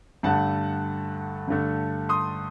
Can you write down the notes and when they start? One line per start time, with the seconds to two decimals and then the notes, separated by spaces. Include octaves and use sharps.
0.23 G2 D3 A3 F#5 A5
1.48 G2 D3 A3
2.09 C6 D#6